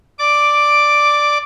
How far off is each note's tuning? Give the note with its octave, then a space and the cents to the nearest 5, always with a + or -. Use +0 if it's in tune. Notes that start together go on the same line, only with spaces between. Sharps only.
D5 +5 D6 +0